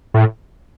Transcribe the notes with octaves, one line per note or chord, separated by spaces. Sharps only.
A2